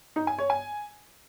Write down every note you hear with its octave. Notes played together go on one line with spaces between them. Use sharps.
D#4
G#5
C#5
G#5